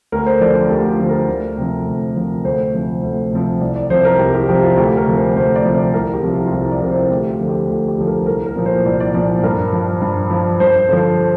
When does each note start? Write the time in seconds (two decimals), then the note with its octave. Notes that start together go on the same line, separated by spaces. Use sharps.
0.12 D2 A#4
0.26 C5
0.41 D3 F3 D5
0.55 A#4
0.70 D2 G4
0.90 F4
0.99 D3 F3
1.09 A#4
1.28 D2
1.58 C3 F3
1.87 D2
2.16 C3 F3
2.45 D2 C5
2.74 C3 F3
3.03 D2
3.32 C3 F3
3.61 C2 D5
3.76 D5
3.90 C3 F3 C5
4.05 A#4
4.19 C2 G4
4.34 G4
4.49 C3 F3 G4
4.63 F4
4.77 D2 G4
4.97 A#4
5.07 C3 F3
5.17 C5
5.35 D2 C5
5.55 D5
5.65 C3 F3
5.74 C5
5.94 C2 A#4
6.13 G4
6.23 C3 F3
6.33 F4
6.45 F4
6.52 C2 G4
6.72 D5
6.81 C3 F3 A#4
6.91 C5
7.10 D2 G4
7.30 F4
7.40 D3 F3
7.49 G4
7.69 D2 F4
7.88 G4
7.98 D3 F3
8.07 A#4
8.26 C2 A#4
8.46 A#4
8.56 A#2 F3
8.66 C5
8.85 C2 D5
9.00 D5
9.14 A#2 F3 D5
9.43 G2 A#4
9.73 F3
10.02 G2
10.31 F3
10.60 G2 C5
10.89 D3 F3 C5